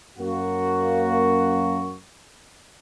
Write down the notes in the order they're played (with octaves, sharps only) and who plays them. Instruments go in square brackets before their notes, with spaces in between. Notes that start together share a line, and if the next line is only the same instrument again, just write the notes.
[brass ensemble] F#2 A#3 F#4